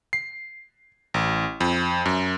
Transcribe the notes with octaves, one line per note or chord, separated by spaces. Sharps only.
C7
A1
F2
F#2